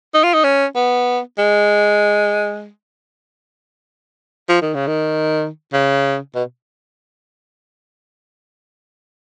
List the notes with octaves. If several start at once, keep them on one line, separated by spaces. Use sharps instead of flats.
D#4
F4
D#4
C#4
B3
G#3
F3
D#3
C#3
D#3
C#3
B2